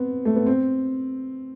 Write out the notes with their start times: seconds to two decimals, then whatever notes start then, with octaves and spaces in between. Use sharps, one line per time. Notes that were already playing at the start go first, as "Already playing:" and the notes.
Already playing: B3 C4
0.25 A3
0.36 B3
0.46 C4